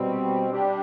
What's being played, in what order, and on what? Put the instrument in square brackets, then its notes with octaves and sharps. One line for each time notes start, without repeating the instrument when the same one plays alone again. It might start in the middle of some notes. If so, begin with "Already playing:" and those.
Already playing: [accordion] B2 G3 C4
G3 D4 G4